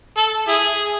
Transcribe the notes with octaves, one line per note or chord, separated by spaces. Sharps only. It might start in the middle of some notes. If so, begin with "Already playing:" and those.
A4
E4 G#4